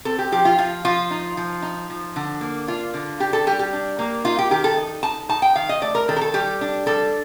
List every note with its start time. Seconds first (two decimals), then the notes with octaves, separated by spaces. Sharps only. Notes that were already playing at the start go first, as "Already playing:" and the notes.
0.05 C4 A4
0.19 G4
0.32 F3 G4
0.45 F4
0.58 F3 F4
0.85 F3 F4
1.11 D#4
1.37 F3
1.62 D#4
1.90 F3
2.16 D3
2.41 A#3
2.67 D4 F4
2.94 D3
3.20 D4 G4
3.33 A4
3.47 G3 G4
3.59 G4
3.73 D4
3.99 A#3
4.25 D#4 F4
4.39 G4
4.51 D#3 G4
4.64 A4
4.77 D#4
5.03 D#4 A5
5.29 D#4 A5
5.42 G5
5.56 D#3 F5
5.69 D#5
5.82 A3 D5
5.95 A#4
6.08 D#3 A4
6.16 A#4
6.21 A4
6.34 G3 G4
6.61 D4
6.86 G3 A4